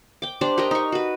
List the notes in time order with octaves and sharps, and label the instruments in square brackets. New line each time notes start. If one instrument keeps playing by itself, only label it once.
[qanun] G5 D6
D4 G4 C5 D5
G4 A#4 D#5 G5
D#4 C#6
F#4 B4